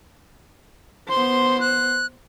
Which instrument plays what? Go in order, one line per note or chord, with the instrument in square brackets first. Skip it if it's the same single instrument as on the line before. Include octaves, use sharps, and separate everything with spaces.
[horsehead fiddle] B3 C5 [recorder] C6
[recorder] F#6